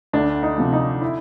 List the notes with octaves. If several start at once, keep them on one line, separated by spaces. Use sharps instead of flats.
D2 D4
D#4
C3 F3
D#4
E4